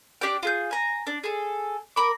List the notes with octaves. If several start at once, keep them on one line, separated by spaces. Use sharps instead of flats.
D4 G4 D5 G5
F4 G#4 G6
G#5 A#5
D4
G#4 A4
A#4 B5 D6